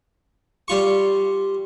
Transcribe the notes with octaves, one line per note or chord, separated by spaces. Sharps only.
G3 F4 C#6